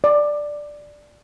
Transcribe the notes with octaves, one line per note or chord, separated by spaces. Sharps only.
D5